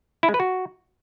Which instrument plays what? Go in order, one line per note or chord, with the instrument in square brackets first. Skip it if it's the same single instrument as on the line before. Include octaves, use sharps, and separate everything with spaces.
[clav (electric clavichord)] E4
G#3
B4
F#4